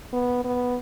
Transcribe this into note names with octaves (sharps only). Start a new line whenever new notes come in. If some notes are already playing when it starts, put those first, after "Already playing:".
B3
B3